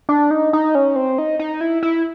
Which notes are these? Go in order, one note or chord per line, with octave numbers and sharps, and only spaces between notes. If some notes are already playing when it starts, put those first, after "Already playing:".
D4
D#4
D#4
C#4
C4
D#4
D#4
E4
E4